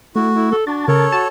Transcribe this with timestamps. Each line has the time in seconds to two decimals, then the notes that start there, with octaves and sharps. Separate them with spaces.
0.16 A3 E4 F#4
0.35 E4
0.52 A4
0.67 D4 F#4 A5
0.88 C#3 A4 A#4 C#5
1.12 F#4 A5